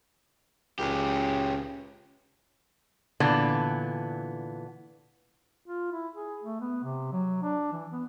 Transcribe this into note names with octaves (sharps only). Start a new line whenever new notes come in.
C#2 C#4 G4
A#2 D3 E3 B3
F4
E4
G#4
A3
B3
C3
F#3
D4
E3
B3